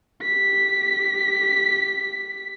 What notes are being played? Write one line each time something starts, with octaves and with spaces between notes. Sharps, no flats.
G4 B6